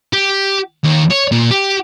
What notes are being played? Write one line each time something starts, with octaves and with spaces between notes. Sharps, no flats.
G4
D#2
C#5
A#2
G4